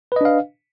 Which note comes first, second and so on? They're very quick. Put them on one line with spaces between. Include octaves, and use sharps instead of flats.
B4 D#5 D4 F5